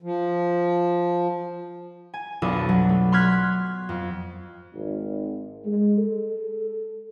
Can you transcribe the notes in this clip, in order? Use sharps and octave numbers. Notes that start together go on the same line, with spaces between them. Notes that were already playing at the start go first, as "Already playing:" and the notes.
F3
G#5
B1 F2 D4 A4 C#6 D#6
F#3
A3
C6 C#6 F6 F#6 G#6 B6
F2
G#1
G#3
A4